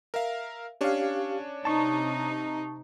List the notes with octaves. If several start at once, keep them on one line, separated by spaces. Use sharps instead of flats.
A#4 E5 F5
C#4 D4 G4 C#5 F5
C3 D#4 A5 C#6